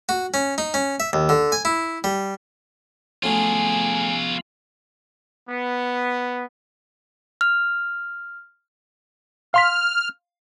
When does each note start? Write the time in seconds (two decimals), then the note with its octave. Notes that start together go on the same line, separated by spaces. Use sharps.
0.09 F#4
0.34 C#4
0.58 D#4
0.74 C#4
1.00 E5
1.13 D#2
1.29 D3
1.52 G#5
1.65 E4
2.04 G3
3.23 F3 F#3 A3 B3 C#4 F4 G#4 G#5
5.48 B3
7.41 F6
9.54 F5 C6 F6 B6